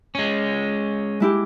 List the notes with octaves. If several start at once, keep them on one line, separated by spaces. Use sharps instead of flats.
G#3 C#4
G#3 E4 G4